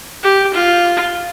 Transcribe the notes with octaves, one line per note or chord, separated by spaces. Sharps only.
G4
F4